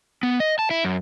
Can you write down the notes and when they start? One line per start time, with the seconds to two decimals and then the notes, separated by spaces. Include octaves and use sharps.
0.23 B3
0.40 D#5
0.59 A5
0.71 E4
0.85 F#2